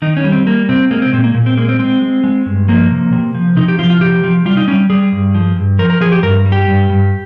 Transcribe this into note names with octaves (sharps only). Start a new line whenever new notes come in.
D#3 D#4
C#4
G3
C4
G3 A#3
C3 C4
G#3 A#3
C4
A#2 C4
A#3
A#2
C4
G#3 A#3
C4
G#3 C4
G#3
G#3
G2
F3 A#3
C3
C3
F3
C3 D#4
G4
F3 F4
F4
C3 G4
F3
G3 F4
D#4
G3 C#4
G3 G#4
G2
F3
G2
F3 A#4
A#4
F3 G#4
G4
G2 A#4
G3
G4
G2
G2